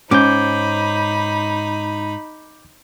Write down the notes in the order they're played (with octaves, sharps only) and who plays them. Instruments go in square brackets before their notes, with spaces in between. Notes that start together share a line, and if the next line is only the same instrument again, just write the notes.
[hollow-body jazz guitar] G#2 C#4 [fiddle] D#4 B5 [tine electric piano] D6 G6